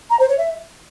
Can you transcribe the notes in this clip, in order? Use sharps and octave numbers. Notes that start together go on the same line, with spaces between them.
A#5
C5
C#5
E5